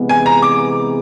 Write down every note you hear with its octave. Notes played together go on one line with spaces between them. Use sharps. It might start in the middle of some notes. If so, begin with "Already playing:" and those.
Already playing: C3 E3 G#3 B3
G#5
A#5
D6